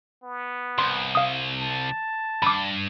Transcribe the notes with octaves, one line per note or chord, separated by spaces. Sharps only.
B3
C2 C6
F5 D#6
A5
G2 B5 D6